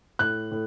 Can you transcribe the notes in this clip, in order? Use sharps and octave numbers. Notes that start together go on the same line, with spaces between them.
A2 F#6
A2